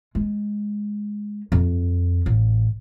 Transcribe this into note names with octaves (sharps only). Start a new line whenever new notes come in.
G#3
F2
A1